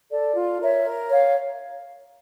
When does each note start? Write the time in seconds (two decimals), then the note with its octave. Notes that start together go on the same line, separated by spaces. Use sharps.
0.11 A4 D5
0.35 F4
0.60 A#4 C#5 E5
0.84 A#4
1.10 C#5 F5